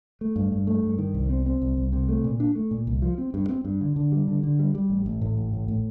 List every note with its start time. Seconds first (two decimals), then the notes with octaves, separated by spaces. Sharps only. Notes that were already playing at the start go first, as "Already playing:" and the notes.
0.21 A3
0.36 G2
0.52 G2
0.67 A3
0.83 G2
0.98 D#3
1.14 C2
1.30 C4
1.46 C4
1.62 C2
1.77 C2
1.93 C3
2.09 A3
2.24 A#2
2.40 D4
2.55 A3
2.71 A#2
2.87 C2
3.02 F3
3.18 C4
3.34 G2
3.49 C4
3.65 G2
3.81 D3
3.96 D3
4.12 G3
4.28 D3
4.43 D3
4.59 G3
4.75 G3
4.90 A1
5.06 A1
5.22 A2
5.37 A1
5.53 A2
5.68 A2